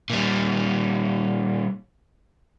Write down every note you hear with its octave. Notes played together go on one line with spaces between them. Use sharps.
A#2 G3